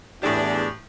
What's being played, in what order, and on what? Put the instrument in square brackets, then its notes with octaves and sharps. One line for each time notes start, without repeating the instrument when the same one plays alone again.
[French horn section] E2 [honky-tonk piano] A2 E4 G4 [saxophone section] D4 G#4